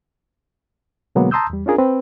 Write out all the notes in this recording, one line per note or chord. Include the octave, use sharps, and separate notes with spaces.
B2 D3 F#3 G#3 A#3 B3
A5 A#5 C6 D#6 E6 G6
E2 G3
C#4 D4 F4 G#4 A#4
C4 B4 C5